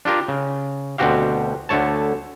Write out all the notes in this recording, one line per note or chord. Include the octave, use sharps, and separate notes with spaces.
D4 F4 G4 A#4
C#3
D2 B2 C4 F#4 G4 F5
D2 D3 A3 C#5 A5